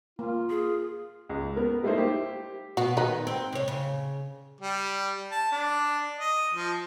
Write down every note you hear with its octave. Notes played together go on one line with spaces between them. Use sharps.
A#3 F4
G#4
C#2
B3 A#4
G3 A3 A#3 D#4 E4 C5
G4 C5
B2 F#4
D#3 D#4 B4
C4
C3 C#5
C#3
G3
A5
D4
D#5
F3